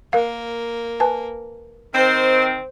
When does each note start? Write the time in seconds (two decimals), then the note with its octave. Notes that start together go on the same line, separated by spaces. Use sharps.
0.13 A#3 A#4 F5
1.00 B4 G#5 A5
1.94 D#3 C4 C5